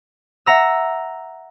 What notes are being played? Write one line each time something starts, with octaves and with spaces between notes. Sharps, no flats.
E5 F#5 A#5 E6